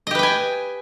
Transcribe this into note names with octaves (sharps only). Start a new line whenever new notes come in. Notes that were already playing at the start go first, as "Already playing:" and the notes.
G4 B4 D#5 G5 G#5